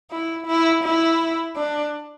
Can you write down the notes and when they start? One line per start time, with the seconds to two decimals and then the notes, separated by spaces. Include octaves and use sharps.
0.11 E4
0.47 E4
0.84 E4
1.56 D4